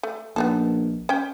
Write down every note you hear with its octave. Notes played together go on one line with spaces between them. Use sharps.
A3
A#1 B3 D#4 A4
C#4 G5